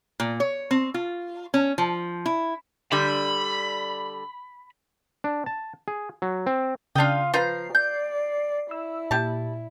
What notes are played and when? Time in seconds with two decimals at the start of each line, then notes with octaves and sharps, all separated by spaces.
0.20 A#2
0.40 C#5
0.71 C4
0.94 F4
1.54 C#4
1.78 F3
2.26 E4
2.92 D3 G3 B5
5.24 D4
5.46 A5
5.88 G#4
6.22 F#3
6.47 C4
6.96 C#3 D4 F4 F5 G5 D#6
7.34 F3 F4 B4 A#5 G6 C7
7.75 D5 G6
8.71 E4 E6
9.11 A#2 G4 A5